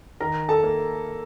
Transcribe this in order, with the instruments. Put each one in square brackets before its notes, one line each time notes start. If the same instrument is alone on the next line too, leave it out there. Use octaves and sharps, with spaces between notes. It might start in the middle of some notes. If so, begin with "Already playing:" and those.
[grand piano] D#3 A#4 A#5
A4 A5
A#3